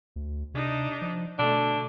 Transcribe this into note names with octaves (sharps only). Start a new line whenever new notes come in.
D2
C3 D4 D#4
F3
B2 D3 A3 D4